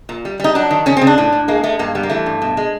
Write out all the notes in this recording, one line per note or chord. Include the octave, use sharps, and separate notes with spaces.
A#2
G3
G3 D#4
F#3 D4
D#3
C#3 C#4
C4
C#3
D4
A2
A2
G#3 A#3
G#3 A3
G2 A#3
G3 B3
A#3
E3 A3
G2
B2
G#3